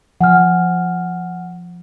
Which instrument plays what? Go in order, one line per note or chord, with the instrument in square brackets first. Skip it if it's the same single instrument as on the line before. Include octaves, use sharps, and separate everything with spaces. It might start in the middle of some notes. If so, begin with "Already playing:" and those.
[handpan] F3 [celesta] F#5 G#5 F6